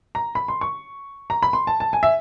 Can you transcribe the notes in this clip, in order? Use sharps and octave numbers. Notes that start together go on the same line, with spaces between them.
A#5
B5
C6
C#6
A#5
B5
C6
A5
A5
G#5
E5